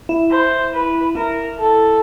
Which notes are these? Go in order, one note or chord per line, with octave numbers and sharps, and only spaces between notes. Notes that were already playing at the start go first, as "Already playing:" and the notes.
E4
C5
B4
E4 A#4
A4